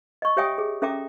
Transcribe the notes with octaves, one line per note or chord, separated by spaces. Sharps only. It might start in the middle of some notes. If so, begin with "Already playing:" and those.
D#5 C#6
G4 C#5 E5 G5 G#5 D#6
G#4
C#4 A4 E5 G5 A#5 D6